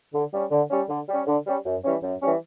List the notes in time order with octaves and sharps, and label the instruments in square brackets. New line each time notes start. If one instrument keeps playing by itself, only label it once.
[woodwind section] D3
G3 C#4
D3
G3 C#4
D3
G3 C#4
D3
G3 C#4
F#2
E3 G3 C#4
F#2
E3 G3 C#4